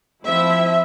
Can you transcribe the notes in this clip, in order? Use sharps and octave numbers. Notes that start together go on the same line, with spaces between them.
F3 C4 E4 E5